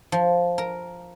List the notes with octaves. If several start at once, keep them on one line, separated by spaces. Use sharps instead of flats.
F3
A#4